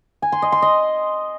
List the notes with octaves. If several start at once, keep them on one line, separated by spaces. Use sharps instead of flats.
G#5
C6
D#5
C6
D#5